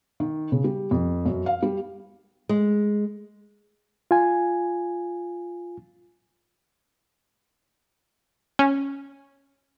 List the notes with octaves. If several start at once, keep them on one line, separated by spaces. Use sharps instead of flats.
D#3
C#3
G3
F2
F#2
F5
G3
G#3
F4 G#5
C#4